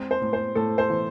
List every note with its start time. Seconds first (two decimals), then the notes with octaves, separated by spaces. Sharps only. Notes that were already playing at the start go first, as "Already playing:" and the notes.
Already playing: G#3 C4
0.11 C5
0.21 A2
0.33 C5
0.55 A2 A4
0.78 C5
0.90 E3